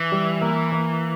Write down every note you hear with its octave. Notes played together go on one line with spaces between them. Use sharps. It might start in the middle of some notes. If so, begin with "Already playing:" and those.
Already playing: E3
G3
A#3
A#3